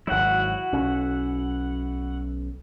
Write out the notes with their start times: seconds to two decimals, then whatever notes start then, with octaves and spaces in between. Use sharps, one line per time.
0.07 G#1 F#3 E4 F#4 F#5
0.72 B1 C#4